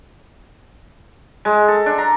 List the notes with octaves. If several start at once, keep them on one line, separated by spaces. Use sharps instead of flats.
G#3
A4
D4
A#5